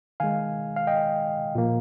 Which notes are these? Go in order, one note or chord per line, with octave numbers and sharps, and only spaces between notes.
D#3 G#3 F5 G#5
F5
D#5 G5
A#2 F3 A#3